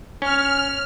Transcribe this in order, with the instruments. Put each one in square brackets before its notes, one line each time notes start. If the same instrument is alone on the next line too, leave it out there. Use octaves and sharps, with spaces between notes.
[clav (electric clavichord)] C#4 [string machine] F6